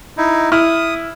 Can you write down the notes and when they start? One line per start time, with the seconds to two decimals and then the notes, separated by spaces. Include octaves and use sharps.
0.18 D#4 E4
0.52 E4 D#6 F6